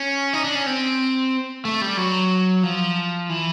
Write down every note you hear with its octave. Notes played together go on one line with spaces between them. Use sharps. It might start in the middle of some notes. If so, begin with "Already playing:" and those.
Already playing: C#4
D#4
D4
C#4
C4
A3
G3
F#3
F3
E3